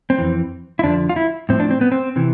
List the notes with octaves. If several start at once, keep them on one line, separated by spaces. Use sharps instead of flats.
C4
F2 E3
E4
F2 D3 F3 D4
F4
E4
A2 F3 C4
D4
C4
B3
C4
C3 E3